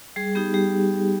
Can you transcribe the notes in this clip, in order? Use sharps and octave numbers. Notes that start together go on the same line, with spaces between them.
G3 G#4
B3 D#4 G4
G3 G4